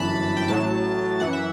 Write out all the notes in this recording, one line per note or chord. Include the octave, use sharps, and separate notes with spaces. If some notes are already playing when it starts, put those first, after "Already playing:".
Already playing: G1 F#2 E3 A5 B5
G5
A1 A2 F#3 A5
F#2 E3 F#5
E5